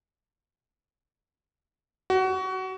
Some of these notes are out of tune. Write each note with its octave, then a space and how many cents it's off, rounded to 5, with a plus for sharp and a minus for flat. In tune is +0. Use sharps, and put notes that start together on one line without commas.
F#4 +25